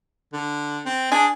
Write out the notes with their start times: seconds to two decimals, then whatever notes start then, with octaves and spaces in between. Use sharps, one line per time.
0.33 D3
0.85 C4
1.12 D4 G#4